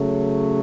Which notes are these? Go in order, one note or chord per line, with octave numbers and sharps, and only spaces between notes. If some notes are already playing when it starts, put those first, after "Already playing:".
Already playing: C#3 F#3 A3